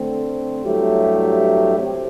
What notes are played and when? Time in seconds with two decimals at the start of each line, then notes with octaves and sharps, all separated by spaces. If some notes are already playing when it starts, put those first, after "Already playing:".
Already playing: D3 A3 C4
0.64 G2 F#3 A3 E4 G4
1.78 C3 F#3 C4 G4